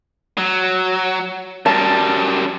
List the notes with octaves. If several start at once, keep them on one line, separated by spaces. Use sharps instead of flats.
F#3
F#2 G3 A5